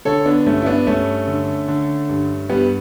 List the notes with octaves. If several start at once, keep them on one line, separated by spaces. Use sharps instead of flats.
D3 A4 C#5
B3 D4
G2 A3 C#4
E4
B3 D4
G2 A3 C#4
D3
D3
G2
G2 G3 B3